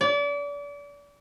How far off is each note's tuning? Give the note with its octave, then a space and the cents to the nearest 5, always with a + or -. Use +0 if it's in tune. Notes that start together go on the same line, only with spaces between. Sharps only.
D5 -35